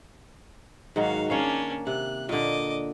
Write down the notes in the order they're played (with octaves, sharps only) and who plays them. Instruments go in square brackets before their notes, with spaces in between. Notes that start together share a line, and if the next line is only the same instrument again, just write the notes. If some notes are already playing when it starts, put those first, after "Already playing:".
[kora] G#2 D#3 F#3 [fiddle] F#4 F5
[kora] A#3 C#5 F5 [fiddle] C#4 D4
[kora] C3 [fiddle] F#6
[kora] A#2 D3 [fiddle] D#5 D6